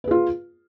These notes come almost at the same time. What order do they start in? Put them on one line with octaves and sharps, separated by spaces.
B4 G#4 F4